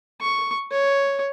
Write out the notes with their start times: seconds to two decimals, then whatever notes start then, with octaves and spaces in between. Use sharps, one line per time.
0.21 C#6
0.71 C#5